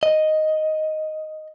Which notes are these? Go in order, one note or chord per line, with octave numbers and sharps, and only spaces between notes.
D#5